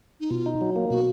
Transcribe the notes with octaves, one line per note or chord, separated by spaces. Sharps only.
D#4
B2 F4
D#4
F#3
A#3
B2 F#4